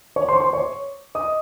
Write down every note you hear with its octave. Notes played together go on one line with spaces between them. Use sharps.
C#5 C#6
C5 C6
C#6
C5 C6
C#5 C#6
D#5 D#6